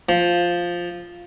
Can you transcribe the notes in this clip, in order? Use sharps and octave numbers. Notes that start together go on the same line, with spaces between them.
F3